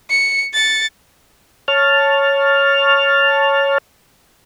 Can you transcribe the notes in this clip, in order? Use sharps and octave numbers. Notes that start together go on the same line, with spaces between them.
C#7
A6 C#7
C#5 A5 F6